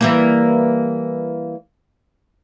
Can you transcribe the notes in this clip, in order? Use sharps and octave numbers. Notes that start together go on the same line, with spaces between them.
E3 G3 A#3